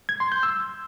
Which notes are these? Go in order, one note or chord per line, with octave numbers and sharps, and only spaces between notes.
G#6
C6
G6
E6